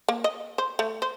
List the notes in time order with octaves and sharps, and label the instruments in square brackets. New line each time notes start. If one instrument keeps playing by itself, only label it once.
[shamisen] A#3
D#5
C5
A3
C5